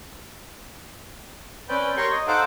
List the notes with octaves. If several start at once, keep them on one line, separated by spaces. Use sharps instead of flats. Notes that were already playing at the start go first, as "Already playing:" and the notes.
C4 C#4 B4 D5 G5
G4 A#4 C#5 G5 C6 C#6
D#5
D#4 A4 C5 F5 F#5 D6